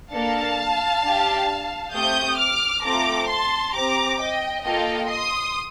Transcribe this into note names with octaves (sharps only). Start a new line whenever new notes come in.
A#3 D4 A4 F5 A5
D4 G4
A3 C4 G4 D#6 G6
D6 F6
A3 C4 F4 A4 A#5 D6
A5 C6
C4 G4 A#5 D6
D#5 G5
A#3 F4 A4 D#5 G5
C6 D#6